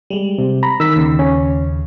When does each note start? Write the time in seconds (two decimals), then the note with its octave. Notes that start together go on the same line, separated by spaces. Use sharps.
0.10 G3 G#3
0.38 C3
0.63 A#5 B5
0.80 D#3 E6 B6
0.96 D#2 C#3
1.19 C#4